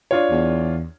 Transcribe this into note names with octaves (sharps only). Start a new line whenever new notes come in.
D4 F4 C#5
E2